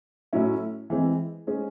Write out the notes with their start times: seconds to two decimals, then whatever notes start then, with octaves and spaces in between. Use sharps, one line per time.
0.33 A2 F#3 C#4 E4
0.90 E3 G#3 C4
1.47 G#3 C#4 G#4 C5